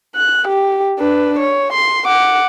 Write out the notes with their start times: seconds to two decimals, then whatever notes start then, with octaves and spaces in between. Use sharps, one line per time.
0.16 F#6
0.48 G4
0.99 D4 B4
1.39 C#5
1.73 C6
2.07 F#5 D6